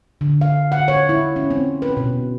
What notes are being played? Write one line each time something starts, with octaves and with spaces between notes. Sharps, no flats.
D3
F5
F#5
C#5
E4
C#4
C4
B4
B2